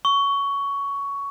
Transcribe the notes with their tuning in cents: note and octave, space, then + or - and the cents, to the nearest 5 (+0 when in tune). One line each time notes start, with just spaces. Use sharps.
C#6 +15